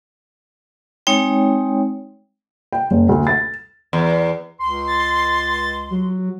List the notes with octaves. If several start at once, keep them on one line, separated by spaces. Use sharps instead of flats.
G#3 C4 D#4 C#5 G5
G5
F#1
D2
A6
E2
C#2 C6
A6
F#3